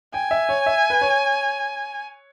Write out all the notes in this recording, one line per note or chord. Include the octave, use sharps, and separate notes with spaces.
G5 G#5
E5
C#5
E5
B4
C#5